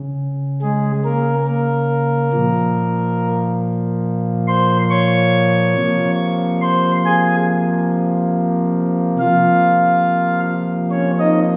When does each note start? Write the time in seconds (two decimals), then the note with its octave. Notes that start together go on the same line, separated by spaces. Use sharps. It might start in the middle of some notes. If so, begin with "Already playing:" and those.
Already playing: C#3
0.62 G#3 G#4
1.04 A#3 A#4
1.47 A#3 A#4
2.33 A#2 F3 A#3
4.48 C5 C6
4.90 C#5 C#6
5.76 C3 F3 A#3
6.62 C5 C6
7.05 G#4 G#5
9.19 C3 F3 A#3 F4 F5
10.91 C#4 C#5
11.20 D#4 D#5